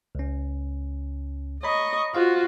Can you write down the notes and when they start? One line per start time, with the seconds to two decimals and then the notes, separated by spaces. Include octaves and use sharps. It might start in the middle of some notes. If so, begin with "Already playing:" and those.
0.15 C#2 C#4
1.63 C#5 D#5 A#5 B5 C#6
2.15 F4 F#4 C5 F5